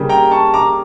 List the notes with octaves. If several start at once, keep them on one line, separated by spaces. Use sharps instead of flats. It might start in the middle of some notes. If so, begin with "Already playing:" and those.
Already playing: C#3 G3 A#3
G5 A#5
A5 C#6
A#5 D6